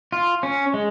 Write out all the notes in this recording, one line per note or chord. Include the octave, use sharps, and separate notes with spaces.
F4
C#4
G#3